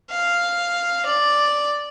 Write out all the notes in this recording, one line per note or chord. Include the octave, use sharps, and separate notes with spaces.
F5
D5